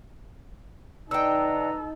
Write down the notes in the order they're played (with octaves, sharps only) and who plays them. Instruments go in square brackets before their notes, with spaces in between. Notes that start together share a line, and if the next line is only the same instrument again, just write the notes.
[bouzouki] D3 G5 [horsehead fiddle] D#4 A4 [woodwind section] B4 D#5 A#5 [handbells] E6